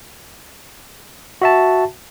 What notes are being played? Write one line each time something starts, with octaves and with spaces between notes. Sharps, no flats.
F#4 E5 A5